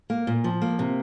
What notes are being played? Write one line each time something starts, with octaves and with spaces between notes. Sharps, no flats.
A#3
A#2
F3
A#3
C3